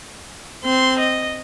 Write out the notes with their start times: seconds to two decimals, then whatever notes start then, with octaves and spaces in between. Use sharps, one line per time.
0.65 C4 C6
0.99 D#5